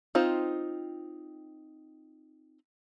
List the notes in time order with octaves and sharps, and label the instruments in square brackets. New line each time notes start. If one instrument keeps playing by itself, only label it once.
[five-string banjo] C4 D#4 F4 C5